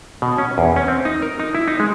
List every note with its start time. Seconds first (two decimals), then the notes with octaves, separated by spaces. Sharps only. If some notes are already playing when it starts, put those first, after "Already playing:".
0.22 B2
0.38 C#4
0.58 E2
0.76 C#4
0.88 C4
1.05 D#4
1.22 A#4
1.40 D#4
1.55 E4
1.68 D#4
1.80 G#3